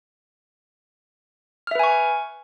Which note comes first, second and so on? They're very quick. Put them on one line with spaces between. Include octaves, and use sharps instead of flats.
F6 E5 B4 G#5 C#6